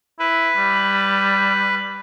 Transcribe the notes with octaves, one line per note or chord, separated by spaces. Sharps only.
E4 B4
G3